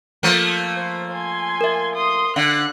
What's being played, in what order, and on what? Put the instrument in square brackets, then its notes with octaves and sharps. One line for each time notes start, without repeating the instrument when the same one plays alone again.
[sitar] F3 A3 A#3
[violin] C5
G#5 C6
[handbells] A#4 E5
[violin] C6 D#6
[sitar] D3 [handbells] F5 [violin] F#5 F#6